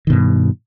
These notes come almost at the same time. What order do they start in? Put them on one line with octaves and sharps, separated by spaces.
D#3 B2 G2